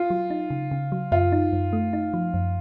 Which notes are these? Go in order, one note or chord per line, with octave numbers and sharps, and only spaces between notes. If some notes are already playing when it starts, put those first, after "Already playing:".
Already playing: F4
F#3
D#4
C#3
C#3
F#3
F#2 F4
D#4
F#2
A3
D#4
F3
F#2